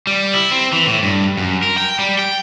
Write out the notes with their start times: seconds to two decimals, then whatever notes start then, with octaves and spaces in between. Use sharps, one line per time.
0.07 G3
0.34 E4
0.52 C4
0.73 E3
0.86 A2
1.03 G2
1.37 F#2
1.63 A#4
1.78 G5
1.99 G3
2.19 G5